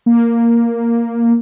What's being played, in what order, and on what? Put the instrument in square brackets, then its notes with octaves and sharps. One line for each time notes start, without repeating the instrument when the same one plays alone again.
[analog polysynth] A#3